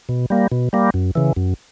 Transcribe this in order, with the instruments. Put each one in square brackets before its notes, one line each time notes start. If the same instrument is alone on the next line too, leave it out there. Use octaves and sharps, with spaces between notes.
[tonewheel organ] B2
G3 A#3
B2
G3 A#3
F#2
C#3 E3
F#2